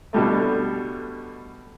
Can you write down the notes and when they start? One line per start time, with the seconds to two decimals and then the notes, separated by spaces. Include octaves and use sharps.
0.13 B2 D3 G3 A3